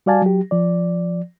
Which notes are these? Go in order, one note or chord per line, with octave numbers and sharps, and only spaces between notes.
G3 F#4 D5 F5 G#5 A5
F#3 G4
F3 D5